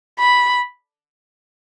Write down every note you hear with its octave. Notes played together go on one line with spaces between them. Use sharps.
B5